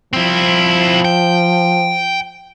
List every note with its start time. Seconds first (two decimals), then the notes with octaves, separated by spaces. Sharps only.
0.13 F3 C4 E4
1.05 G5